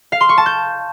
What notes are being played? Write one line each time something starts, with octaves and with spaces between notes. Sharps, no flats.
F5
C6
C#6
A5
G6